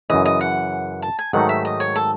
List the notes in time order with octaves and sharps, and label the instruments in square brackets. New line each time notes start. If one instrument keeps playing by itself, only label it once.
[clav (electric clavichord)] F#2 C#3 E3 [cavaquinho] D#5
[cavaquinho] D#5
F#5
A5
G#5
[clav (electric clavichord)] G#2 D#3 F#3 A3 D#4 [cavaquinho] F#5
[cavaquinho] E5
D#5
C#5
A4